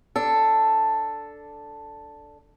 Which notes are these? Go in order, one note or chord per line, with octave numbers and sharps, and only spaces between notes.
D4 A4